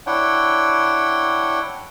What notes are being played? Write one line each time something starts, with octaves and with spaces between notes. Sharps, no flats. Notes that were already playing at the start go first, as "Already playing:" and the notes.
D4 E4 C#5 F#5 G5